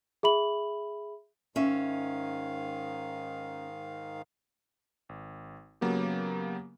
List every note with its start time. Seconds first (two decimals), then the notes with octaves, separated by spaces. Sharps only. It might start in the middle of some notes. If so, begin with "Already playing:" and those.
0.23 G#4 E5 B5 F#7
1.56 G#2 D#3 C#4 E5 F5
5.09 G#1
5.81 C#3 F#3 A#3 B3 G4